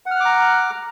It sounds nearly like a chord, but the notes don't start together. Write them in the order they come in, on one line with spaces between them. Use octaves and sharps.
F#5 F6 F#6 D6 A#5